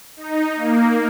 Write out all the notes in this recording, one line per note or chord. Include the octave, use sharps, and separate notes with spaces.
D#4
A#3